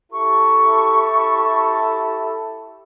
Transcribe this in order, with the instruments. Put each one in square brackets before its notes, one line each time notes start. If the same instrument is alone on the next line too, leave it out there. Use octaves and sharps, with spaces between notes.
[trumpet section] E4 G4 A4 [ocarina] C#6